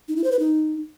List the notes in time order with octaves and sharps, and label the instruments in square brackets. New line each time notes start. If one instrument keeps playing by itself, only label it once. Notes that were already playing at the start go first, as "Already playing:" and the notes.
[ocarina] D#4
E4
C5
B4
D#4